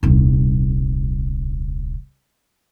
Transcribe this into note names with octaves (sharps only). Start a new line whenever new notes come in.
D#1 C2